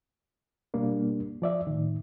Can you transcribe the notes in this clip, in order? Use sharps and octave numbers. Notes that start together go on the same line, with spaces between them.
B2 G3 A#3 D4
F3 D5 E5
A2 D#3